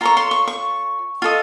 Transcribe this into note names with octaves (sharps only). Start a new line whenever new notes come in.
F4 A4 C#5 A#5
C6
C#6
C#6
F4 A4 D#5